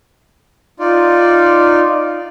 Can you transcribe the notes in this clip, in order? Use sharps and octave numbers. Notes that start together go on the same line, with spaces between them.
D#4 F4 D5